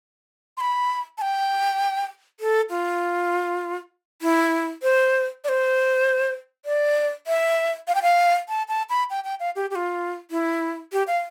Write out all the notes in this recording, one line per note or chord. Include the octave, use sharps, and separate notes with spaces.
C6
B5
A5
G5
A4
F4
E4
C5
D5
C5
D5
E5
F5
G5
F5
A5
A5
B5
G5
G5
F5
G4
G4
F4
E4
G4
F5